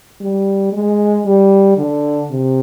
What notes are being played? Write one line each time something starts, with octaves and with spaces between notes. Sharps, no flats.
G3
G#3
G3
D3
C3